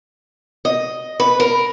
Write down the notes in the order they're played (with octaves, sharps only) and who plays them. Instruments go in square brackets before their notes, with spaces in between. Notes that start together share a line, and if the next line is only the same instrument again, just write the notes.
[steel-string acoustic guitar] D#5
B4
A#4